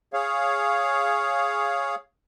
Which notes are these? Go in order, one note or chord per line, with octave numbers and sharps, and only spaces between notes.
G#4 C#5 F5